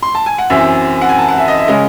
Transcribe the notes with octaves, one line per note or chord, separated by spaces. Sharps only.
C6
A5
G#5
F#5
F#2 E3 C4 E5
F#5
G#5
A5
F#5
E5
D#5
E5
C#3 G#3 C#4 D#5